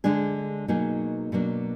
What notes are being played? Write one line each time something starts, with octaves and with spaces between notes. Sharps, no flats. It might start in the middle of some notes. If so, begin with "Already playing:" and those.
D3 G#3 D4 G#4
B2 F#3 A#3 D#4 G#4
B2 F#3 A#3 D4